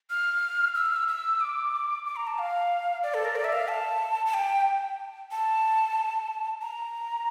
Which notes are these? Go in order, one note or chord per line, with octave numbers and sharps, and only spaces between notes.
F6
E6
F6
E6
E6
D6
D6
A#5
A5
F5
D5
A4
A#4
D5
E5
F5
A5
A5
G5
A5
A#5